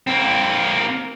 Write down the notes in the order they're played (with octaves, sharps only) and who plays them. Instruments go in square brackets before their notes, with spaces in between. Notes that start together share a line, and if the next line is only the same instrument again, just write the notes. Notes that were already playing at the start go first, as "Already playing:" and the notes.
[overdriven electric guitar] A#3 C4